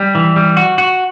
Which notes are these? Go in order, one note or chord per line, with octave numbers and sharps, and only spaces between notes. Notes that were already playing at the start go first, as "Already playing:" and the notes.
Already playing: G3
E3
G3
F#4
F#4